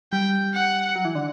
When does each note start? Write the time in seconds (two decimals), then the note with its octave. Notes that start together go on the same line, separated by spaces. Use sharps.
0.12 G3 G5
0.53 F#5
0.96 F#3
1.05 E3
1.15 D3